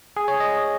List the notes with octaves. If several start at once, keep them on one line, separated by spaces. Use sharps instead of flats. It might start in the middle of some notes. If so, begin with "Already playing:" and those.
G#4
C#5
D#5